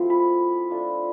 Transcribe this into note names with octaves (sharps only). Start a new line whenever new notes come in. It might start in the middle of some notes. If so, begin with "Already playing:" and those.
Already playing: F3 A3 C4 E4
B5
A3 D4 F4